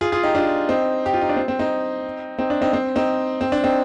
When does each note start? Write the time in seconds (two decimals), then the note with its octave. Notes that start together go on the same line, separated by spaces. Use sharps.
0.01 F4 G#4
0.12 F4 G#4
0.23 D#4 G4
0.35 D4 F4
0.69 C4 D#4
1.06 G4
1.13 F4
1.22 D#4
1.29 D4
1.36 C4
1.48 C4
1.59 C4 D#4
2.39 C4 D#4
2.50 D4
2.61 C4 D#4
2.73 C4
2.96 C4 D#4
3.41 C4
3.52 D4
3.63 C4 D#4